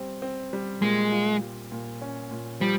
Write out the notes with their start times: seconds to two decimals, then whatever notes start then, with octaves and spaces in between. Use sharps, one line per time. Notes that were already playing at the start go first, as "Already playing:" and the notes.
Already playing: G3 C4
0.22 C4
0.53 G3
0.82 A#2 G#3
1.12 F4
1.41 G3
1.72 A#2
2.01 C#4
2.31 A#2
2.61 F3 G3